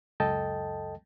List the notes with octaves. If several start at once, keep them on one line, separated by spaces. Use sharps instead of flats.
C#2 F#2 A4 D#5 G5 A5